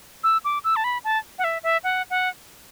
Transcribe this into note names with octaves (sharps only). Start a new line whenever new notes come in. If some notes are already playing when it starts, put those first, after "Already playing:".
E6
D6
E6
A5
B5
A5
F#5
E5
E5
F#5
F#5